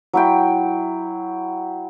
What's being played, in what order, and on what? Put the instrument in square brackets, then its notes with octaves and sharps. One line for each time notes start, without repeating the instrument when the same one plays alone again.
[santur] F#3 E4 G5